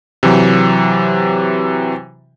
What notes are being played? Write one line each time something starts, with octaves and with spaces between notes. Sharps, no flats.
C3 E3 F#3